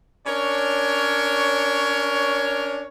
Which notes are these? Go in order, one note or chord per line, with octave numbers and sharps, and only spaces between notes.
C#4 D4 A#4 C#5